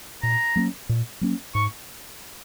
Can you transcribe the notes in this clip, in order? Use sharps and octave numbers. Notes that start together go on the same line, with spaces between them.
A#2 A#5
F#3 A#3 C#4
A#2
F#3 A#3 C#4
G#2 C#6